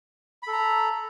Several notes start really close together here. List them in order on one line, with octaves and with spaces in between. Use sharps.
B5 A4 A#5